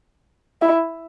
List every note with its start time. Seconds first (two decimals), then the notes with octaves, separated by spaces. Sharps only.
0.62 E4